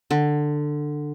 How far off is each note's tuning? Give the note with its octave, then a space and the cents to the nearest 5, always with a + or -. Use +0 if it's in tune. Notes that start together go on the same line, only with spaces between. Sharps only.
D3 +15